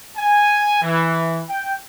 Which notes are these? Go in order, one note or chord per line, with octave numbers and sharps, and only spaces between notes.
G#5
E3
G5